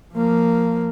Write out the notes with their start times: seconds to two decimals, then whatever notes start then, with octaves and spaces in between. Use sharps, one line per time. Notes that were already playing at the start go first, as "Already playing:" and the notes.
0.14 F3 A#3